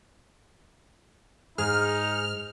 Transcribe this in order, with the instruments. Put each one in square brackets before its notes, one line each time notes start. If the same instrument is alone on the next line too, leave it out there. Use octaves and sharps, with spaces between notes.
[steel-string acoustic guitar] G#2 [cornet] D#4 [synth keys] G#4 [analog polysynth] F6